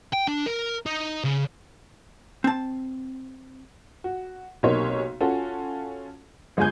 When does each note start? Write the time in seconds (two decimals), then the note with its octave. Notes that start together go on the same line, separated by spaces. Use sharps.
0.13 G5
0.28 D4
0.46 A#4
0.86 D#4
1.24 C#3
2.44 C4 A5
4.04 F#4
4.63 B1 C3 A#3 D#4 C#5 C6
5.21 C#4 F4 F#4 A4
6.57 G1 G#3 F4 G#4 G#5 G6